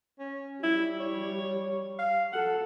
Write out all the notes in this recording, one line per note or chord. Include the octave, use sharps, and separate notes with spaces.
C#4
G3 E4
C#5
F5
A4 F#5